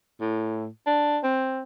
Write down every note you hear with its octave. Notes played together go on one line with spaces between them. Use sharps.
A2
D4
C4